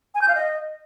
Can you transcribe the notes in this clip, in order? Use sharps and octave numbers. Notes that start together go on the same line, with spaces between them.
G#5
G6
F5
D#5